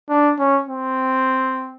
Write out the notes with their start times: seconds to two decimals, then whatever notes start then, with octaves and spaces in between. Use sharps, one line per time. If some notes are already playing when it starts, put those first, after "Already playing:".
0.09 D4
0.39 C#4
0.69 C4